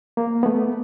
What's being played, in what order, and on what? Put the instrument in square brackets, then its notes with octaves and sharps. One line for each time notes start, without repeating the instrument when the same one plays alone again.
[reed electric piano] A#3
A3 B3